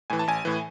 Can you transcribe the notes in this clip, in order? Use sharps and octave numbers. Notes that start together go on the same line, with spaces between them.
A2 E3 G#5
A5
A1 G#5
A2 E3